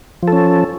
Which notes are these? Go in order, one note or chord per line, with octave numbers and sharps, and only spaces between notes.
F3 C#4 A4